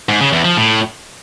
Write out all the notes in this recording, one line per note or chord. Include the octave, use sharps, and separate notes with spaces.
G#2
C#3
E2
F3
A2